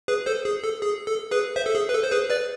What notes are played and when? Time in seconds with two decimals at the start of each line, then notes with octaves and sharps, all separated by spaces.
0.08 G#4 B4
0.26 A4 C5
0.45 G#4
0.64 A4
0.82 G#4
1.07 A4
1.31 G#4 B4
1.56 C5 E5
1.66 A4
1.75 G#4
1.89 B4
1.93 A4
2.03 C5
2.12 G#4 B4
2.30 B4 D5